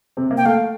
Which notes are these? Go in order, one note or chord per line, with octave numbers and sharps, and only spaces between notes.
C3 C4
A#3
G5
A3 F5